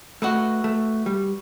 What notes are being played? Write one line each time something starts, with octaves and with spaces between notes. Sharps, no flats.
A3 F#4 B4 D#5
A3
G3